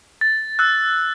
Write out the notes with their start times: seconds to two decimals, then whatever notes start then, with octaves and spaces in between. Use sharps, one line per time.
0.21 A6
0.59 E6 F#6